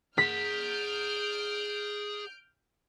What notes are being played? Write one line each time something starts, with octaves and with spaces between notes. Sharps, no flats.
G#4 F#5 F6 G6 B6 D7